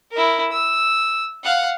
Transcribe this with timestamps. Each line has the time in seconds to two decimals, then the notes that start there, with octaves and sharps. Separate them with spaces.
0.12 E4 A#4
0.52 E6
1.44 F5 F#5